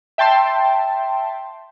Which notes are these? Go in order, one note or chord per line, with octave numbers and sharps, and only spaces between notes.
E5 G5 A5 C6